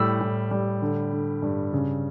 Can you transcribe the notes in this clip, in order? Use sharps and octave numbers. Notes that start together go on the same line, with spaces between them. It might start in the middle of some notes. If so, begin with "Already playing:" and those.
Already playing: A2 G3 E6
A2
G3
D3
D3
G2
C#3